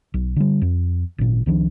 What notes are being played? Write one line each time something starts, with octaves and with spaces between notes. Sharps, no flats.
B1
D3 G3
F2
G#1 A#2
C#2 D#3 F3 D4